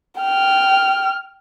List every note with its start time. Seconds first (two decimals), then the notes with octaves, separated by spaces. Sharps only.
0.20 G5 F6